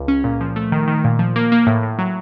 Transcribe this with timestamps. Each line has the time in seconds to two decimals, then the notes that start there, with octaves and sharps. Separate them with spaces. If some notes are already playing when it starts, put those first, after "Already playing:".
Already playing: C#2
0.08 C#4
0.24 A#2
0.41 F3
0.56 A3
0.72 D#3
0.88 D#3
1.04 A#2
1.19 F3
1.36 A#3
1.52 A#3
1.67 A2
1.83 A2
1.99 F#3